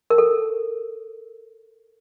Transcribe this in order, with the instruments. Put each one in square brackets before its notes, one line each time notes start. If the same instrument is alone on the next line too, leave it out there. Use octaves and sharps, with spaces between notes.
[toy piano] A#4
A4